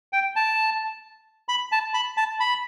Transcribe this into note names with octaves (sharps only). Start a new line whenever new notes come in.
G5
A5
B5
A5
B5
A5
B5